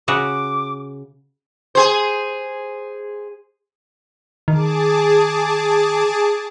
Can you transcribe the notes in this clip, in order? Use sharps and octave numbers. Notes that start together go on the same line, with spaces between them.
C#3 F#4 D6
G#4 C5
D#3 G#4 A5 D6